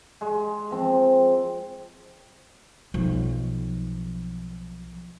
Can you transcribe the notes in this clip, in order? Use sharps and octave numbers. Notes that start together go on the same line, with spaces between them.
G#3
F3 C4
B1 F3